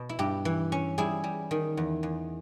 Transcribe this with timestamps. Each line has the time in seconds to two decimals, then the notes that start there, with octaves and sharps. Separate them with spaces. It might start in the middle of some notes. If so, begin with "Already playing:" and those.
Already playing: B2
0.09 E4
0.19 G2 G4
0.45 E3
0.72 C#4
0.98 G3 E4 G#4
1.24 G3
1.51 D#3
1.77 E2
2.03 E2